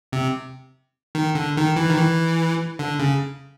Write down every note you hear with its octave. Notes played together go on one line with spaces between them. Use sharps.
C3
D#3
D3
D#3
E3
D#3
E3
D3
C#3